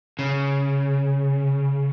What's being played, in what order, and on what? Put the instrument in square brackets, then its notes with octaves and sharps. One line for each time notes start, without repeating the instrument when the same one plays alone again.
[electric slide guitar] C#3